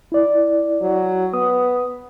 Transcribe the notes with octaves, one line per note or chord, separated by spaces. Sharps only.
E4 D5
F#3
B3 D#6